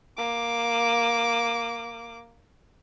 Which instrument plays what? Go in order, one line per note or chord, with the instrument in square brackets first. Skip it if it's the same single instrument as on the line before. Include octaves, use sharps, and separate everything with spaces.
[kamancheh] A#3 D6